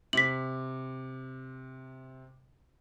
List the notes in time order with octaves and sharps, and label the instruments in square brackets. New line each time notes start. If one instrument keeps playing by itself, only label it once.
[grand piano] C3 [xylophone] B6 F#7